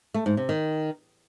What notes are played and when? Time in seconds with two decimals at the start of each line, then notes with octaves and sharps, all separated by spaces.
0.14 A3
0.26 G#2
0.37 C3
0.49 D#3